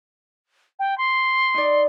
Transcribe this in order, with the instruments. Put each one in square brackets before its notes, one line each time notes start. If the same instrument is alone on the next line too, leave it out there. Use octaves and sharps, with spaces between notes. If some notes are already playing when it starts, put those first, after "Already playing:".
[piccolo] G5
C6
[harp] D#4 D5